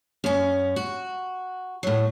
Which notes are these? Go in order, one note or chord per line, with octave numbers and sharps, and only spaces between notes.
F#2 C#4
F#4
A2 F#3